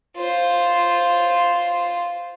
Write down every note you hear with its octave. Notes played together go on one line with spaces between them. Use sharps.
F4 C5